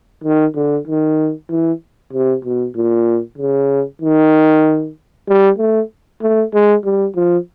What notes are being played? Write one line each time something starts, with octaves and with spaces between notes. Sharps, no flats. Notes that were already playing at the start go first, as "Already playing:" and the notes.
D#3
D3
D#3
E3
C3
B2
A#2
C#3
D#3
G3
A3
A3
G#3
G3
F3